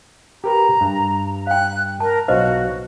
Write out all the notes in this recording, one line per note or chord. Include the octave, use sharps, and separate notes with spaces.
G4 A#4 B4 A#5
G2
F5 G5 F#6
A#4 A5
B1 F4 F#4 B4 C5 D#5